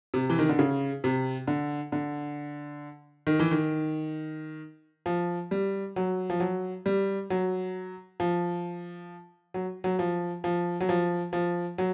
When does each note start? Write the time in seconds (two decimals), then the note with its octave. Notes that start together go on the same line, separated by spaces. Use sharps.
0.14 C3
0.30 E3
0.39 D#3
0.49 D3
0.59 C#3
1.04 C3
1.48 D3
1.92 D3
3.27 D#3
3.39 E3
3.51 D#3
5.06 F3
5.51 G3
5.96 F#3
6.30 F3
6.40 F#3
6.86 G3
7.30 F#3
8.20 F3
9.54 F#3
9.84 F#3
9.99 F3
10.44 F3
10.81 F#3
10.89 F3
11.33 F3
11.78 F#3